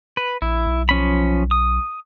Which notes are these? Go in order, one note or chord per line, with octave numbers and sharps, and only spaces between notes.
B4
A#1 E4
B1
F3 C#4 B5
D#6